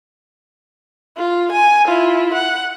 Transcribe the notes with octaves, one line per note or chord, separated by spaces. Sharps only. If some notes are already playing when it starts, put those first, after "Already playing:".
F4
G#5
E4 F4
F#5